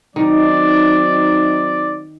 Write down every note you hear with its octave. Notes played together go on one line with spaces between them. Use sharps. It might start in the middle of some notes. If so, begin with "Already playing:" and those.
D#3 F#3 C4 D#4 D5